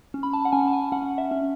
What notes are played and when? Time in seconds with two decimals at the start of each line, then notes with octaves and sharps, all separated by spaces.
0.14 C#4
0.23 B5
0.33 A5
0.45 F#5
0.52 C#4 G#5
0.67 A5
0.73 G#5
0.92 C#4 F#5
1.18 E5
1.31 C#4